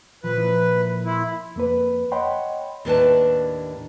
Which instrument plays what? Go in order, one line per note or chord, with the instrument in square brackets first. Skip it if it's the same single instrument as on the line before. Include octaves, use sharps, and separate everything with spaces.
[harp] A#2 F3 [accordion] B4
[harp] A#3 E4
[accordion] E4 [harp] C6 D#6
[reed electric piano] F2 A#3 B4
C#5 D#5 F#5 G5 B5 C6
[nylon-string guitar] D#2 A2 D4 B4 D5 A5